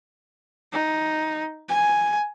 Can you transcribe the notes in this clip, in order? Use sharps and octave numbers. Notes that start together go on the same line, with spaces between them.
D#4
G#5